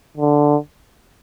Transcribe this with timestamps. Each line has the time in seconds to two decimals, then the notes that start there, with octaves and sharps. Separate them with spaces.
0.17 D3